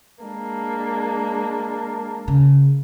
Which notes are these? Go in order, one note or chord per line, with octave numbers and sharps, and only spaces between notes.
G#3 A#3 D4
C#3